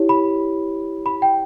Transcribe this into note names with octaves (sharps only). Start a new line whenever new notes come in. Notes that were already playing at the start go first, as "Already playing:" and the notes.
Already playing: E4 G4 C#5
B5
B5
G5